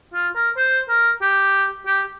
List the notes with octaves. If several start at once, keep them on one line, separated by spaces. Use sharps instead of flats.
F4
A#4
C5
A#4
G4
G4